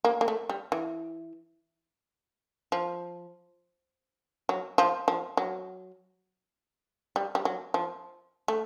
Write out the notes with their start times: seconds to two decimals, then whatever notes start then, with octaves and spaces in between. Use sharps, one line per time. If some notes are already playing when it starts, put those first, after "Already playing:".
0.04 A#3
0.21 A#3
0.28 A3
0.49 G3
0.72 E3
2.72 F3
4.49 F#3
4.78 F3
5.08 F3
5.37 F#3
7.16 G3
7.35 G3
7.45 F#3
7.74 F3
8.48 A3